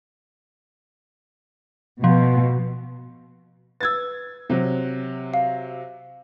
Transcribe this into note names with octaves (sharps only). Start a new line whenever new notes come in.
B2 F3
B4 E6 G#6 A6
C3 F#3
F5